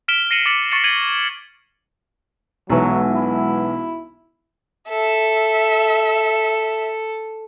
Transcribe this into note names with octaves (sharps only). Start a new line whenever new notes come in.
F6 B6 D7 E7 G7
A#6 C7 C#7 D#7 E7 F#7
D6 A6 C#7 E7 F#7
C#6 A6 C#7 E7
G#6 D#7 F#7 G7
B1 E3 F#3 G#3 F#5 E6
E4
A4 E5